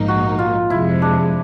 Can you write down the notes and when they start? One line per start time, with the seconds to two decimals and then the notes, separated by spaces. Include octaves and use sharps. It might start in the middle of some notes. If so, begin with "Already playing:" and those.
Already playing: A#1 G#2 F3 A#3 D#4
0.08 F#4
0.39 F4
0.70 F2 C3 F3 G#3 E4
1.02 D4